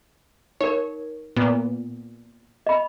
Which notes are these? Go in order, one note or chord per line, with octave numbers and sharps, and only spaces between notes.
D#4 A#4 C#5
A#2 B3
D#5 B5